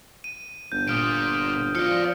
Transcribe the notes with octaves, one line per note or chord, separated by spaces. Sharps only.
D#7
G1 G6
A#2 D#6 F6 D7
F3 D5 F5 F6 C#7